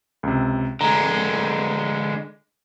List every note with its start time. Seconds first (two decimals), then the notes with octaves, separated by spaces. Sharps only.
0.23 C#2 C3
0.81 D3 G#3 A#5